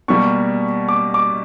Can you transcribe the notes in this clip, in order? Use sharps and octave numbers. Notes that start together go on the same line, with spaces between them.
B2 G3 A#3 C#6
D6
D6